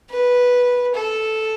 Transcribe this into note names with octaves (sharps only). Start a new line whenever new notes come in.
B4
A4